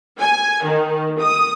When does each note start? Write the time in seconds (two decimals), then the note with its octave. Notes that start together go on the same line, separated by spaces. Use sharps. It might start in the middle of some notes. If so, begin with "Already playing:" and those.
0.19 G#5
0.64 D#3
1.20 D#6